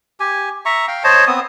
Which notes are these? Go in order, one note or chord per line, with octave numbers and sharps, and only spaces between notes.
G4 G#5
E5 A#5 C#6
F5 G5
C5 C#5 D#5 A5
B3 C4 D#6